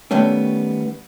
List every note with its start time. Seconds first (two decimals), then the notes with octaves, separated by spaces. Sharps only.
0.11 D#3 G3 A3 B3 C#4